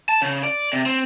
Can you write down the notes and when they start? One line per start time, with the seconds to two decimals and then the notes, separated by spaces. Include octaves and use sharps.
0.09 A5
0.22 C#3
0.43 D5
0.73 C3
0.86 C4